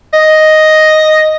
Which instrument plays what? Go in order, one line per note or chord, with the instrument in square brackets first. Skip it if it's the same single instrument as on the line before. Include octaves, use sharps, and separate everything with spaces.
[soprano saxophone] D#5